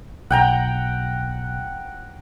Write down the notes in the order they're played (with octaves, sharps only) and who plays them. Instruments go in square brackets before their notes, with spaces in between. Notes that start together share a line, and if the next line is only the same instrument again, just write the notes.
[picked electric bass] B1 [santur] F#5 G5 A#5